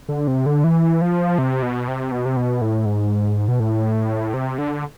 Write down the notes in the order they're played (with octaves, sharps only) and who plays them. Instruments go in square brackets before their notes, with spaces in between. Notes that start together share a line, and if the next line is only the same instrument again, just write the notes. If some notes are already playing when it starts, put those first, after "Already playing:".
[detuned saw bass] D3
C3
D3
E3
F3
C3
B2
C3
B2
C3
B2
A2
G#2
B2
A2
C3
D3